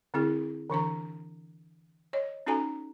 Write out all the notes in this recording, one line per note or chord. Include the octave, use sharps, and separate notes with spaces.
D3 C4 E4 G#4
D3 E3 D4 A#5
C#5 D#5
C#4 D#4 F#4 A4 G#5 A#5